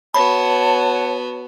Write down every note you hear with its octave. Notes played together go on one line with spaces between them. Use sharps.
B3 F#4 C#5 A5 B5